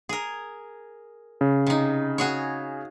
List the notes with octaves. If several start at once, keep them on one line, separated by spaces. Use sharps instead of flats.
G#4 A#4
C#3
C3 D#4
F#4 G#4 C#5